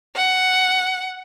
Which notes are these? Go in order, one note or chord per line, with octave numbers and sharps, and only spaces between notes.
F#5